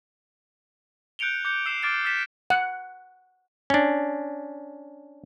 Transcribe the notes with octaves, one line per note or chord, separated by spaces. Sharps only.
F#6 G6 C#7 D7 F7 G7
D6 G6 C#7
E6 C7 E7
D6 F6 A6 D7 E7 F7
E6 A6 B6 E7
F#5
C#4 D4